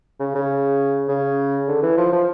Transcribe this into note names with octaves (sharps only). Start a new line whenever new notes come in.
C#3
C#3
C#3
D3
E3
F3
F3